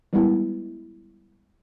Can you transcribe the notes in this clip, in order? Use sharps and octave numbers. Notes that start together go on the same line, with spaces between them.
E3 G3 G#3 B3 E4